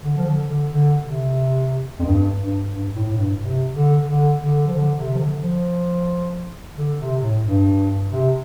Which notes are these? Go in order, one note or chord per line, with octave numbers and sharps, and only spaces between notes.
D3
F3
D3
D3
D3
C3
F2
G2
G2
G2
A2
A2
G2
C3
D3
D3
D3
F3
D3
C3
F3
D3
F3
D3
C3
A2
G2
C3